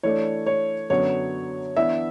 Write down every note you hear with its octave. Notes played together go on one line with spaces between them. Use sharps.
E3 A3 D4 A4 C#5 D5
C#5
F#2 D3 F#3 B3 F#4 C#5
E3 B3 D4 E5